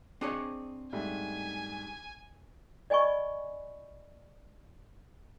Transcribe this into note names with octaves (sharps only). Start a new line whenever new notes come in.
C4 D4 G#4 C#5 D#5
G#2 G3 A3 G#5
D5 D#5 G#5 B5 C#6